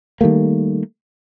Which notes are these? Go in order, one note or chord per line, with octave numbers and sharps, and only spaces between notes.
D#3 G3 A3 A#3